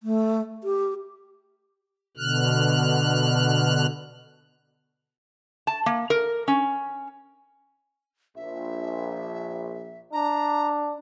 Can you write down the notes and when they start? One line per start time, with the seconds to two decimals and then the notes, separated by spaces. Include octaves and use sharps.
0.03 A3
0.64 G4
2.17 B2 D3 F6 F#6
5.67 A5
5.86 A#3
6.10 A#4
6.48 C#4
8.36 A#1 E5
10.13 D4 A#5